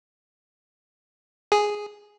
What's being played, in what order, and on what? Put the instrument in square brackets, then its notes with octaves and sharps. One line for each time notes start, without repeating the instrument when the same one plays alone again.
[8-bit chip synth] G#4